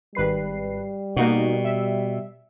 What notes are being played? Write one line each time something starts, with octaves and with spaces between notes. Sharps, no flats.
G#1 G3 B4 C7
B2 A#3 D#4 F#4
E5